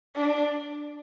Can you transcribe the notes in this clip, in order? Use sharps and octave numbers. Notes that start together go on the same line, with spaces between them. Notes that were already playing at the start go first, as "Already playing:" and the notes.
D4